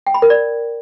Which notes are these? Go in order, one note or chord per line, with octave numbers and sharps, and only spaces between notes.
G5
B5
A#4
D5